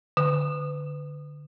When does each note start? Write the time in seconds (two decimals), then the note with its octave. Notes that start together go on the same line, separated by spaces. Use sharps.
0.17 D3